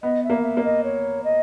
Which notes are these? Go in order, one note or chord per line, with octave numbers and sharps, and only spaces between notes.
B3 D#5
E5
A#3
E5
A#3
D#5
C#5
D#5